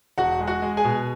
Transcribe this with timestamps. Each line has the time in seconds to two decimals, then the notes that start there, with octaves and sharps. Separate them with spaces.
0.18 E1 F#4 F#5
0.40 G#3
0.47 F#4 F#5
0.62 G#3
0.77 G#4 G#5
0.85 B2